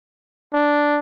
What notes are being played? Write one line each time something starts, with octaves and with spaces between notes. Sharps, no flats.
D4